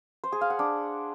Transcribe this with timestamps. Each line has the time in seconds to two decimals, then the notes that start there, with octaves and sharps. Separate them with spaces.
0.24 C5
0.32 G#4
0.41 F5
0.50 F#5
0.59 D4